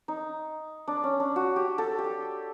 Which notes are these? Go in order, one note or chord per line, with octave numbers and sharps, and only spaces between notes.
D#4
D4
C#4
D4
F#4
G4
A4
G4